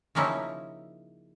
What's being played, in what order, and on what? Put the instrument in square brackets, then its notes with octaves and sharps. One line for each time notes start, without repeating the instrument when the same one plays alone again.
[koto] C#3 F3 A#3 C#4 D#4 E4